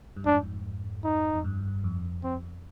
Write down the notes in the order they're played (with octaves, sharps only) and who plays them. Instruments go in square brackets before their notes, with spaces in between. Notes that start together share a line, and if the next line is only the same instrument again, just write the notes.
[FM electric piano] G2
[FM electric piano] F2 G#2 [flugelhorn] D4
[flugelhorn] D#4
[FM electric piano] F2
G2
F2
[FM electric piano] F2 [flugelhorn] C4